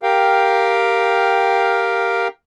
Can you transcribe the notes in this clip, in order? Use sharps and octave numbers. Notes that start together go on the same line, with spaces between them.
G4 A#4 F5 G5